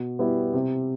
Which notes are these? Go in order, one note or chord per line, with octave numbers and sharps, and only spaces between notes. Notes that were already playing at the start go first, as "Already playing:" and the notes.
Already playing: B2
G3 B3 E4
C3